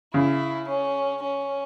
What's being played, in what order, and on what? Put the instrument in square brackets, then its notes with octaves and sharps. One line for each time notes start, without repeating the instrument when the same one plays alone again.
[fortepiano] C#3 [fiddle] E4
[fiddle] C#4
C#4